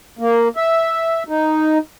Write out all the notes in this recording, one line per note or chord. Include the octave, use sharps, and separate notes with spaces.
A#3
E5
D#4